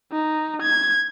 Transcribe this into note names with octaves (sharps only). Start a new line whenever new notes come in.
D#4
G#6